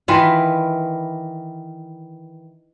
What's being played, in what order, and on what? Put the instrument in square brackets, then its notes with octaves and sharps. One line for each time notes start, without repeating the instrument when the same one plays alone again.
[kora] D#3 E3 F4 B4